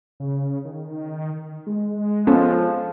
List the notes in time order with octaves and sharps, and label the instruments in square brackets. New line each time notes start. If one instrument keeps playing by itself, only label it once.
[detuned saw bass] C#3
D#3
G#3
[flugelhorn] F3 [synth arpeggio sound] B3 C#4 A4